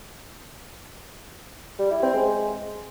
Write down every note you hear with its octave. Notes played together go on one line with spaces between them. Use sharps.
G3
E4
C4
G#3